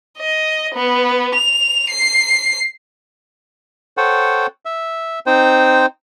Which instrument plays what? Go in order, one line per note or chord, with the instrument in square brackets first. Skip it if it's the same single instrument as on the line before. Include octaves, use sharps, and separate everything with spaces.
[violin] D#5
B3
F7
C7
[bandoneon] A4 C5 C#5 F#5 G5
E5
C4 D#4 C5 G5